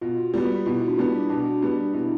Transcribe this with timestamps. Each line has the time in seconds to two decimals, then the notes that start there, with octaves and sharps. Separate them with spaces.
0.01 B2 F4
0.34 G3 B3
0.66 B2 E4
0.88 D4
0.98 G3 B3
1.08 D4
1.29 B2 D4
1.62 G3 B3
1.94 B2 E4